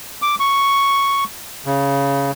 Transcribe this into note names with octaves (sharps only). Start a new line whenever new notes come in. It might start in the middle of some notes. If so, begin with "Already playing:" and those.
D6
C#6
C#3